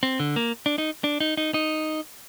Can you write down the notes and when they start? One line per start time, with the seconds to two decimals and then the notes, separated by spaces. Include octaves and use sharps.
0.03 C4
0.20 D3
0.36 A#3
0.66 D4
0.78 D#4
1.04 D4
1.20 D#4
1.37 D#4
1.54 D#4